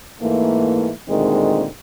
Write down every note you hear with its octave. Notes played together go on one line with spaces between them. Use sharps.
G#2 E3 A3 A#3
D2 A#2 D#3 G#3 C4